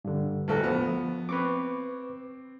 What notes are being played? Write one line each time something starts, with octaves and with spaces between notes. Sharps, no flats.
G2 D3
D1 G1 A4
F3 B3
C4 B4 C#6 D6